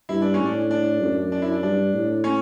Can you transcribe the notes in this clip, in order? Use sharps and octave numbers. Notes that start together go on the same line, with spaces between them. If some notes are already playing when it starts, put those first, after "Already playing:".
G2 E4
D4
C#4
A2
D4
D4
F#2
D4
E4
D4
G2 D4
A2
C#4